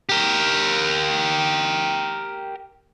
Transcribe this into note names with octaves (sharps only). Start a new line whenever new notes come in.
G4 A#4